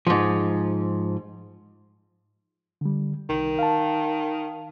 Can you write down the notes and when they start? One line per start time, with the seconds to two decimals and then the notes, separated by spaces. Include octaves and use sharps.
0.07 G#2 F3
2.81 D3 G3
3.29 C2 D#3
3.59 F5 A5